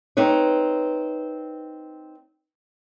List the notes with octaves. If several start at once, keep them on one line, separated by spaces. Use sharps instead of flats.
C4 D#4 B4 C#5